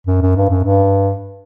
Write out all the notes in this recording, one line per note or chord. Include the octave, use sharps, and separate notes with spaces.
F#2
F#2
G2
F#2
G2